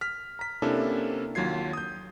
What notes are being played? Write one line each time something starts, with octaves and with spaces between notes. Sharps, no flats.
F6 B6
A#5 B6
C3 A#3 C#4 D4 E4 A4
D#2 F#3 F4 G#6 C7
D#6 G6